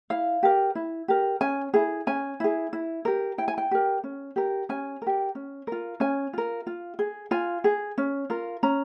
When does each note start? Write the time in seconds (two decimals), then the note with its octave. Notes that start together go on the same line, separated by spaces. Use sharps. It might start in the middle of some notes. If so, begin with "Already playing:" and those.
0.10 E4 F5
0.43 G4 A#4
0.75 E4
1.08 G4 A#4
1.41 C#4 G#5
1.74 E4 G#4
2.07 C#4 G#5
2.40 E4 G#4
2.73 E4
3.05 G4 A#4
3.38 E4 G5
3.48 G#5
3.58 G5
3.71 G4 A#4
4.04 C#4
4.36 G4 A#4
4.69 C#4 G#5
5.02 G4 A#4
5.35 C#4
5.67 F4 A#4
6.00 C#4 G#5
6.33 F4 A#4
6.67 F4
6.99 G#4
7.31 F4 G#5
7.64 G#4
7.98 C#4
8.30 F4 A#4
8.63 C#4 A#5